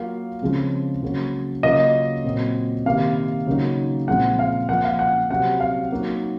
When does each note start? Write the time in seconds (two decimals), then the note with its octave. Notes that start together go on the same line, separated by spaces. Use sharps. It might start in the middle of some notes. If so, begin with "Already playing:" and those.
Already playing: F#3 A#3 F4 F5
0.41 C#3 F3 G#3 C4
1.02 C#3 F#3 A#3
1.63 C#3 F#3 A#3 C#4 F4 D#5
2.24 A#2 F#3 C4
2.86 C3 D#3 A#3 F5
3.47 C#3 F#3 A#3 D#4
4.08 A#2 F3 G#3 C4 F#5
4.39 F5
4.69 F3 A#3 F4 F#5
4.84 F5
4.99 F#5
5.30 C3 F#3 C4 F#5
5.60 F5
5.91 F#3 A#3 D#4